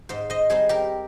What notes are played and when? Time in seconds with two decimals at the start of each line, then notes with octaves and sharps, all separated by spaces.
0.09 G#2 C5 D#5
0.30 C5 D#5
0.50 G3 C4 D#4 G#4 C5
0.69 G4 A#4